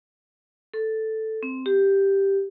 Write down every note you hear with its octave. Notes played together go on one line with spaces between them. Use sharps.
A4
C4
G4